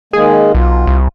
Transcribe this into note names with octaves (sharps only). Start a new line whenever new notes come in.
D#3 G#3 A#3 G#4
B1 F4
C2